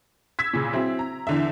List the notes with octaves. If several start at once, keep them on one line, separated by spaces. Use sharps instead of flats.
E6 G#6 B6
A#2 C#3
F#3 C4 E4
A#5
E2 D3 E5